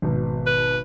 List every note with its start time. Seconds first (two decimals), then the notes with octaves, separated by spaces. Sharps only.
0.02 G#1 B2
0.46 B4